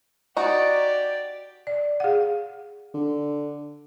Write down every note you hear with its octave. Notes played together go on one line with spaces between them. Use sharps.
D#4 F#4 G4 D5
D5
G#4 F5 F#5
D3